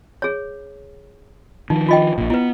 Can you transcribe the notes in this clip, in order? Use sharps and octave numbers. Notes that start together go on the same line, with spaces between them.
G#4 C#5
D#3 F3 D#4
F4 D#5 G5
A#1 A#2
B3 E4 B4